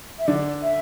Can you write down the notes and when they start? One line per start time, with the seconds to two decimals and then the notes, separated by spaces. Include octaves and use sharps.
0.19 E5
0.27 D3 D5
0.63 E5